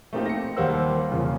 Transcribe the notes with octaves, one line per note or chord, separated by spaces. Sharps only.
A3 A#3 C4 D#4 G4
A#6 C#7
D#2 G3 A#3 C5 F#5 E6
E2 C#3 F3 A#3